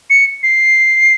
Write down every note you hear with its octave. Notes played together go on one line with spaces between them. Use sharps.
C#7
C7